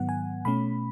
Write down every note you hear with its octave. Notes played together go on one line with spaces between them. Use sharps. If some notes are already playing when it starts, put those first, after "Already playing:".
Already playing: G#2 D#3 F#3 B3 F#5
G#5
B2 A3 C#4 B5